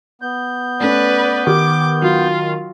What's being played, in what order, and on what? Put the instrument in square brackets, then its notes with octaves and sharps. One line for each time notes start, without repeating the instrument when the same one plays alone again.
[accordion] B3 G6
[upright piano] A3 C#4 [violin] B4 D5
[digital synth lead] D#3 [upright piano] G4 [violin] D6
[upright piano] F#3 [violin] F4